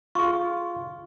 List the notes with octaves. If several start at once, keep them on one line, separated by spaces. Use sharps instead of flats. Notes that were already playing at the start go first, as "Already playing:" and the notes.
F4 G#4 C#6